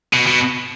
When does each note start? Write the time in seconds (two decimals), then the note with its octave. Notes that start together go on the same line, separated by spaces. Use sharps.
0.13 B2
0.27 B2